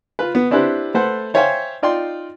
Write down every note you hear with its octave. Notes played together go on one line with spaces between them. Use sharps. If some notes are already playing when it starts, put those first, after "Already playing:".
F4 B4
B3
C4 D4 E4 G4 B4 C5
A3 A4 B4 C5 F#5
C5 C#5 E5 F5 G5 G#5
D#4 F4 D5 G5 C6